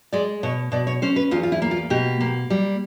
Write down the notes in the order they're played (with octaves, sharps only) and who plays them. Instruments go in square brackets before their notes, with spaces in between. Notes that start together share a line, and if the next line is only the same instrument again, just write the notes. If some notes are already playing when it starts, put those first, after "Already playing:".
[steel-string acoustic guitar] G#3 D5
B2 C#5
B2 D5
C#5
C#4 C5
B4
E2 F4
F4
E4
A#3
F4
B2 G4
A#3
G3